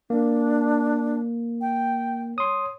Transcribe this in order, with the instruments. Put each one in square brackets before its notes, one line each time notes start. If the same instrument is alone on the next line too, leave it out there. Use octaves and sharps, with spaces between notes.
[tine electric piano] A#3 [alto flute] D4
[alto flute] G5
[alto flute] C#5 [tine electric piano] C6 D#6